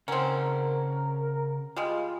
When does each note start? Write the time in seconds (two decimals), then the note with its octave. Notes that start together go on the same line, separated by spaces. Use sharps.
0.08 C#3 C4 C#4 A#4 F#5
1.76 G3 G#3 F4